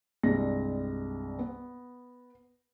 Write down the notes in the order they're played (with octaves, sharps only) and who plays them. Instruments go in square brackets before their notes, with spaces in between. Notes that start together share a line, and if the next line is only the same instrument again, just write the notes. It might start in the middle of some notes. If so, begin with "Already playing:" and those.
[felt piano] C2 G2 G#3 A#6
B3